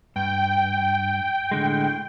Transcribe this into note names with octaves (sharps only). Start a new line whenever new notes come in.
G2 G5
A2 D3 G#3